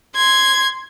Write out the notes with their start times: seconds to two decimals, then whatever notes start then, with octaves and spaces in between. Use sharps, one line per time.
0.16 C6 G#6